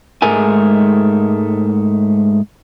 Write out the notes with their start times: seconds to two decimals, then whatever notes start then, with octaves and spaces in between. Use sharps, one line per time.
0.22 G#2 G#3 A3 A#4 G#5